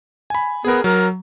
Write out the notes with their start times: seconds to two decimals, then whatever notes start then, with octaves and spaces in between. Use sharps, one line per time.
0.30 G#5 B5
0.64 B3 G#4 A#4
0.84 F#3 A#4